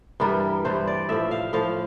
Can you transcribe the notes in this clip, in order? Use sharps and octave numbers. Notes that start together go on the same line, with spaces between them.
G2 E3 G3 A#4
G2 E3 G3 C5
D5
A2 F3 E5
F5
A2 F3 F5